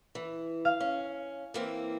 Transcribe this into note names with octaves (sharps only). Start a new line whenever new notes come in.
E3
F5
C#4
E3 A#3 C4